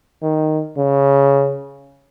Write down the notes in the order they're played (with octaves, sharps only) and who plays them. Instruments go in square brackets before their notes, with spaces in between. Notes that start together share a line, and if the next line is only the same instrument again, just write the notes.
[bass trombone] D#3
C#3